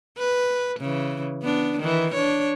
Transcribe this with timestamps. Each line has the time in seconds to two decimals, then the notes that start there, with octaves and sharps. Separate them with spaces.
0.18 B4
0.80 C#3 E3
1.43 B3 D4
1.80 D#3 E3
2.14 D4 C#5